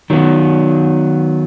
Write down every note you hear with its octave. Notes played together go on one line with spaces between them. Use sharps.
D#3 F#3 B3